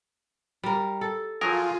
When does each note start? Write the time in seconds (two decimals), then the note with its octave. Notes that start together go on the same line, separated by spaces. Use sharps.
0.63 G3 A#4
1.01 A4
1.41 F3 F#3 F4 G#4 A#4